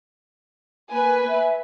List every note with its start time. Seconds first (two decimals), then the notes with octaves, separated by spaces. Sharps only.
0.91 A#3 B4 G#5
1.27 E5